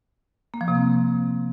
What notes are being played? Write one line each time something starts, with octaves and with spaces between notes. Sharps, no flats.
A#3
F3
C3
C4